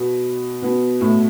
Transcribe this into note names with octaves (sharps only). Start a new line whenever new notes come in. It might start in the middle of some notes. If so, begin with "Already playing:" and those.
Already playing: B2 B3
B2 B3
A2 A3